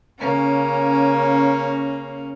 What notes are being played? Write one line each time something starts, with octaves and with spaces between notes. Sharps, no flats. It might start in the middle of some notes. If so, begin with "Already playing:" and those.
C#3 A#3 C#4